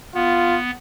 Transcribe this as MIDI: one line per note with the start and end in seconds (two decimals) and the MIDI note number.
0.15 0.71 59
0.15 0.57 65